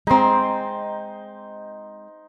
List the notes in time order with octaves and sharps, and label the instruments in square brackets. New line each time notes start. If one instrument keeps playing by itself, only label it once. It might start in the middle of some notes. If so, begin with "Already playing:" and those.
[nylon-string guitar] G#3 C4 [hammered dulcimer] D#4 C6